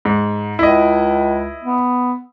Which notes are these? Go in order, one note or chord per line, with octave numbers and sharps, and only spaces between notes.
G#2
C#2 E4 D#5
B3